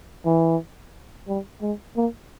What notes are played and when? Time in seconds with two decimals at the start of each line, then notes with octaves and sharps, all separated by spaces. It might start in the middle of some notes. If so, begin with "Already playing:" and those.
0.26 E3
1.28 G3
1.62 G#3
1.97 A#3